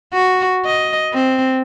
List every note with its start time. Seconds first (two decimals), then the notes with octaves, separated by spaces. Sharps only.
0.13 F#4
0.65 D#5
1.13 C4